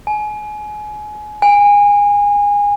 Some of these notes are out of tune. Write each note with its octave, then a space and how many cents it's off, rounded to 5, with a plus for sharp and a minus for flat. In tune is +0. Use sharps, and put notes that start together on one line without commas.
G#5 +25
G#5 -25